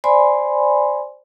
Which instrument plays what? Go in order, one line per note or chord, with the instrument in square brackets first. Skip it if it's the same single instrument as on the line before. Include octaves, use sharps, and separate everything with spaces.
[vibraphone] C5 D5 G#5 B5 C6